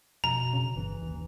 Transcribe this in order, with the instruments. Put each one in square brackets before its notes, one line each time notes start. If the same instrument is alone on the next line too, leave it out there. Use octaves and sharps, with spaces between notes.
[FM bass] F2 [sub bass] B2 [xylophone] A#5
[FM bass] C#3
[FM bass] G1 [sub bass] E3
[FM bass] D#2